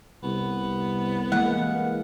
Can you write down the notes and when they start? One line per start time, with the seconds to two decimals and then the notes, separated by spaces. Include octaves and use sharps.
0.23 C2 B3
1.32 E3 G#3 A#3 F#5